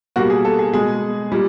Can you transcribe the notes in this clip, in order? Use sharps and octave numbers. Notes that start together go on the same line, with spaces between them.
B2 G3 A#3 F#4
G#4
A4
G#4
B2 G#3 G#4
A#2 G3